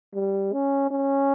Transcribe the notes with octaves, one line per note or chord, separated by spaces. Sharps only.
G3
C#4
C#4